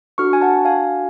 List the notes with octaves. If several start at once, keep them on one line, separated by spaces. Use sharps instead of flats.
D4 F#4 A4 C#6 F6
G#5
F#5 A5
F5 G#5